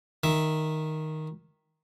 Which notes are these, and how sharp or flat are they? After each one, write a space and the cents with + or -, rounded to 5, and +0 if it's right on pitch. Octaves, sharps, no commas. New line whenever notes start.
D#3 +0 E5 +0